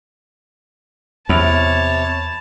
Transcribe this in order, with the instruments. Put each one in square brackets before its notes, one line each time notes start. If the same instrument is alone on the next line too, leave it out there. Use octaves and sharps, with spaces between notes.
[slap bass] E2 [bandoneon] C3 C#5 [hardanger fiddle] A5 [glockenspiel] B5 F7